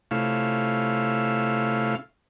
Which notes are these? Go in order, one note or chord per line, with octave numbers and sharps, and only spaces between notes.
C3 A3 C#4 E4 F4 F5